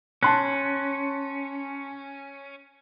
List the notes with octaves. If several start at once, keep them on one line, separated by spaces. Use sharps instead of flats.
C#4 A5 C6 F#6